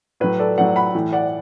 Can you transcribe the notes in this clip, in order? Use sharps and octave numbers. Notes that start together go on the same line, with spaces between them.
A2 F#3 B4
A4 D5
A2 F#3 D5 F#5
F#5 B5
A2 E3
D5 F#5